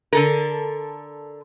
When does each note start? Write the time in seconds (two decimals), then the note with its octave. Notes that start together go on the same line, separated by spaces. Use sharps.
0.13 D3 A4 A#4